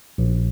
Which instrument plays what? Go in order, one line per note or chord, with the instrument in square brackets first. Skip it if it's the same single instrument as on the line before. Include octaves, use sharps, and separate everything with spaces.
[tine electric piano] A#1